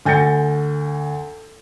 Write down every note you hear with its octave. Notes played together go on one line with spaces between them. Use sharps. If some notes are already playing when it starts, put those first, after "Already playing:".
D2 G#5 G6 A6 A#6 C#7